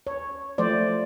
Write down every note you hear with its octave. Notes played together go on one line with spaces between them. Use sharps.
C#5
F3 A3 C5 D5